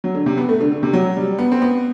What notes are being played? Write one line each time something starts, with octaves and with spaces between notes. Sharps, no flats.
F#3
D3
C3
B3
A3
D3
D3
C3
F#3
G3
B3
C4
B3